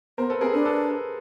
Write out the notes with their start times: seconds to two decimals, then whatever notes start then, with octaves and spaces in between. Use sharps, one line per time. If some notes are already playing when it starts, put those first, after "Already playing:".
0.18 B3 A#4 C5
0.30 A4 B4
0.41 C4 G#4 A#4
0.53 D4 A4 B4
0.64 A4 B4
0.89 A4